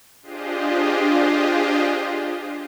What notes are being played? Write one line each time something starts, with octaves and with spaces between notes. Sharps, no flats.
D4 F4 G4 G#4 C5 D#5